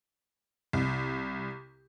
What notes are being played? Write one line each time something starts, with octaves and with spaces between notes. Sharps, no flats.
C2